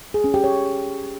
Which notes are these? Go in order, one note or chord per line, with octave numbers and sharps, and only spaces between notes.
G#4
C#4
G4
C#5